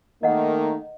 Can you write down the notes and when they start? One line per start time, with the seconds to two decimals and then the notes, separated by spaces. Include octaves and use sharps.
0.23 D#3 A3 A#3 D#4 D#5 F#5